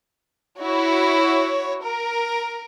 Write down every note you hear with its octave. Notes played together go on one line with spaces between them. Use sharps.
E4 F#4 C#5
A#4